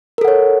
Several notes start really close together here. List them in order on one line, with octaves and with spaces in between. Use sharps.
A#4 A4 F#5 C#5